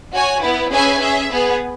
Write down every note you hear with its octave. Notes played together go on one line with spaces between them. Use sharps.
F#4 C#5 G#5
B3 E4 B4
C#4 G#4 B4 E5 G#5
C#4 G#4 E5
B3 G#4 B4